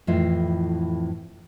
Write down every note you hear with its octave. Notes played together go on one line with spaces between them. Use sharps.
F2 A2 E3 E4 F4